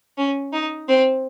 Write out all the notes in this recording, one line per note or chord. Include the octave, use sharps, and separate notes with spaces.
C#4
D#4
C4